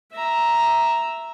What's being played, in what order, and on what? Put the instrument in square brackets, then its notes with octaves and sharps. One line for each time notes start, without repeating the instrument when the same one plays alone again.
[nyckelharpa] E5 A#5